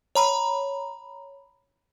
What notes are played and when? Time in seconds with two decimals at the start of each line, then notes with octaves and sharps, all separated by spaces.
0.15 C#5 A#5 B5